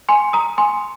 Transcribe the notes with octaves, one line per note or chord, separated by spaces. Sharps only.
G#5 C6
A#5 D#6
G#5 C6